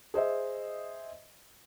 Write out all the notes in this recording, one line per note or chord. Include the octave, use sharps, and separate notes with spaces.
G#4 C5 D#5 E5